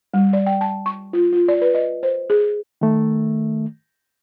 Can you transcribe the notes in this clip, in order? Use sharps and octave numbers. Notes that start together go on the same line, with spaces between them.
G3
D5
G5
A5
C#6
F4
F4
D5
B4
D#5
C5
G#4
D#3 A3